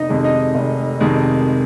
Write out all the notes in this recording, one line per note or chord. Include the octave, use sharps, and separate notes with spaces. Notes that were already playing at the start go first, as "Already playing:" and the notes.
Already playing: F1 D#4 D#5
F2 C3 D#3 G#3
D#4 D#5
F1
F2 C3 D#3 G#3